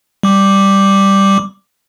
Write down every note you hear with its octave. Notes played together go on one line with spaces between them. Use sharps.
G3 D6